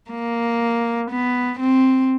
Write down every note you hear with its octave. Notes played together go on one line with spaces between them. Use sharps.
A#3
B3
C4